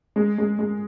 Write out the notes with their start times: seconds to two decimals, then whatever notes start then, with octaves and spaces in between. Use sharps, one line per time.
0.16 G#3
0.38 G#3
0.59 G#3